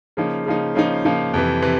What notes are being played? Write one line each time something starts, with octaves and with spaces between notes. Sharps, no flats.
C#3 F3 A#3 D#4
C#3 F3 A#3 D#4
C#3 F3 A#3 D#4
C#3 F3 A#3 D#4
F2 C3 E3
C3 E3